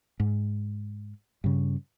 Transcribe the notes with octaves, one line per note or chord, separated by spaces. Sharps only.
G#2
G2 C#3